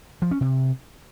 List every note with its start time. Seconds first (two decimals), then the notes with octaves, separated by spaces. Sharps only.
0.22 F3
0.31 C#4
0.41 C3